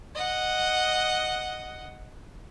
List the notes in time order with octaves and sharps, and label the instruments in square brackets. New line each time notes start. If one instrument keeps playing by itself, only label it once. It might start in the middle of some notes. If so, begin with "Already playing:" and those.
[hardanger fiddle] D#5 F#5